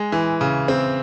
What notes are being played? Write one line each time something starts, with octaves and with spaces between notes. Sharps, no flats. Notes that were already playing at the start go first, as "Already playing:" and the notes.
Already playing: G#3
E3
C#3
C4